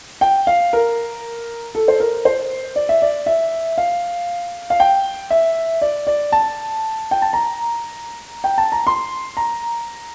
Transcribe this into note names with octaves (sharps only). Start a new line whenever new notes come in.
G5
F5
A#4
A4
C5
A#4
C5
D5
E5
D5
E5
F5
F5
G5
E5
D5
D5
A5
G5
A5
A#5
G5
A5
A#5
C6
A#5